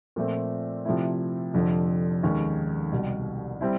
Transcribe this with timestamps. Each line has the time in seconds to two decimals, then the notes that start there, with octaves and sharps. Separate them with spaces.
0.16 A#2 F3 A3 C4
0.85 C3 F3 A3 C4 E4
1.54 F1 F2 D3 F3
2.23 D#2 D#3 G#3 C#4
2.92 C2 B2 G3
3.61 G3 C4 E4